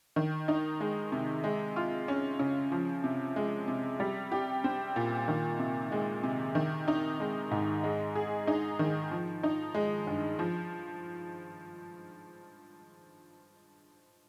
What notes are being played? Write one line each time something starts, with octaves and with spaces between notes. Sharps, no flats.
D#3
D#4
G#3
C3
G#3
F4
C#4
C#3
F3
C3
G#3
C3
G3
G4
C4
A#2
D#3
C3
G#3
C3
D#3
D#4
G#3
G#2
G#3
G#4
D#4
D#3
F3
D#4
G#3
G2
F3